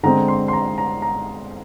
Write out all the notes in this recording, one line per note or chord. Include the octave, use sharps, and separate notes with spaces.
D3 G#3 C4 A#5
C6
C6
A#5
A#5
A#5